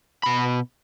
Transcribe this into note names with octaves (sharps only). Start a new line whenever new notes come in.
B2 B5